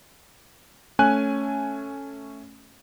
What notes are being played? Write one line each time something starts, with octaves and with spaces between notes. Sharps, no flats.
A3 C#4 G#5 F#6